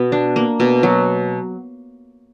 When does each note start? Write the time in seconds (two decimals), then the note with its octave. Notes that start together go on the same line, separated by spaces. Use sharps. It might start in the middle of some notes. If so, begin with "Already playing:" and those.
Already playing: B2 B3
0.12 D4
0.36 A#3
0.60 B2
0.83 F#3